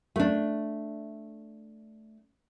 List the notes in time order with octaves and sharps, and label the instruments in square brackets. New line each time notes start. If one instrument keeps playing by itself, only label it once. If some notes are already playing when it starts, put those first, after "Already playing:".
[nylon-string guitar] A3 D4